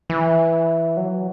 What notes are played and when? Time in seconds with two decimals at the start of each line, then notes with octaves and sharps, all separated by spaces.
0.10 E3
0.97 F#3